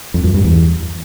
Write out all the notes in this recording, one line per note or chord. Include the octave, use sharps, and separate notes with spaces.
F2
F#2
G2
E2